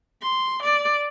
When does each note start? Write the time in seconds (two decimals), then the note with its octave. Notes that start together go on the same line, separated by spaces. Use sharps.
0.22 C6
0.63 D5